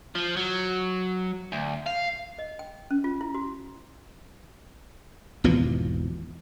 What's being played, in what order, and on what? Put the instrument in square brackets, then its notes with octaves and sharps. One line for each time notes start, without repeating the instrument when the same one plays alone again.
[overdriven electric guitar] F3
F#3
D2
F5
[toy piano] D#5
G5
C#4
F4
E4
F#4
[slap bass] G#1 E2 B2 F3